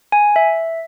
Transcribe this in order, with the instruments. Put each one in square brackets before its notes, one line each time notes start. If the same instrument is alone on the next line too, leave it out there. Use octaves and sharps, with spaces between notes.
[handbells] G#5
E5